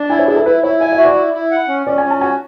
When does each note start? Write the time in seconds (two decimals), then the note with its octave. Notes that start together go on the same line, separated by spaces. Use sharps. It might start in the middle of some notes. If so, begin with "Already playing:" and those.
Already playing: D4
0.10 E4 G#5
0.19 C#5
0.28 E4 G#4
0.36 A4
0.45 E4 B4
0.63 E4 C#5
0.80 E5 G#5
0.92 E5
0.98 F#4
1.05 D5
1.15 E4
1.33 E4
1.51 F#5
1.68 C#4
1.86 C#4 D5
1.98 G#5
2.04 C#4
2.10 A5
2.21 F#4 G#5